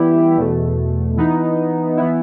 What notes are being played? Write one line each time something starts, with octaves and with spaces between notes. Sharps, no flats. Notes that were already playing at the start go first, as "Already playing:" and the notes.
Already playing: E3 G3 B3 E4 G4
E2 B2 A3
E3 B3 D#4
E3 B3 E4